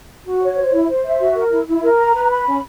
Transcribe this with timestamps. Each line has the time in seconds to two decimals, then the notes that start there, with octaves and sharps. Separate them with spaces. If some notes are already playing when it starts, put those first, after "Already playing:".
0.25 F#4
0.41 C#5
0.56 C5
0.72 E4
0.88 C5
1.04 E5
1.20 F#4
1.36 A#4
1.51 E4
1.67 E4
1.83 A#4
1.99 A#5
2.14 B4
2.30 B5
2.46 C#4